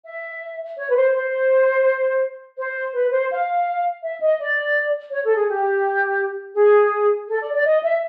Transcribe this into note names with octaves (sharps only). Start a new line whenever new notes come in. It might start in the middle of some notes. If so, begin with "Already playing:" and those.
E5
C#5
B4
C5
C5
C5
B4
C5
F5
E5
D#5
D5
C#5
A4
G#4
G4
G#4
A4
D5
D5
D#5
E5